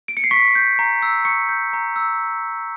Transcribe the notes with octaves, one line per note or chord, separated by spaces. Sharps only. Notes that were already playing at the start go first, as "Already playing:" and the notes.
D7
C#7
C7
C#6 B6
G6
A#5
E6
C#6 C#7
G6
A#5
E6